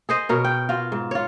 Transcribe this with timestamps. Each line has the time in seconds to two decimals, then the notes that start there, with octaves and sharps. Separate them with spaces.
0.09 G#4 C5 D#5
0.29 B2 A#4 C#5
0.44 G5
0.69 F4 F#4
0.92 G#2
1.11 F4 C#5